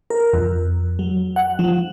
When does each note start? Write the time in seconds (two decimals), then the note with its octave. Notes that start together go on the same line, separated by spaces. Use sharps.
0.10 A#4
0.33 F2
0.99 F#3
1.36 F#5
1.59 F3